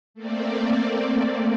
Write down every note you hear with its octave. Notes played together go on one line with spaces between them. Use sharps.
A3 A#3 C4 D5